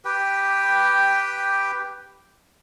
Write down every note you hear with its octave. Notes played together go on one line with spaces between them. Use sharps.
G4 B4 G5